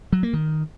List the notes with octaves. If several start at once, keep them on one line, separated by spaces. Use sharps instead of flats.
F#3
A#3
D#3